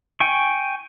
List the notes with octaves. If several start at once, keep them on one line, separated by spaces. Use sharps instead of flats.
G5 G#5 C#6